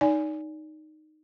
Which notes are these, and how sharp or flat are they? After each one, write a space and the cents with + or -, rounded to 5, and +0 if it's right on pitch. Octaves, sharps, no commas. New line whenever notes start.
D#4 -10 D5 -30 G#5 +0